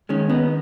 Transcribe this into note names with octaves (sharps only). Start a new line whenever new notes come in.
D#3 G#3 C#4
B3 D#4